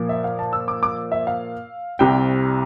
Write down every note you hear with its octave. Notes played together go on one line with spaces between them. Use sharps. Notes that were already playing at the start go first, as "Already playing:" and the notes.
Already playing: A#2 F3 A#3
E5
F5
A5
E6
D6
D6
E5
F5
C2 C3 G3 G5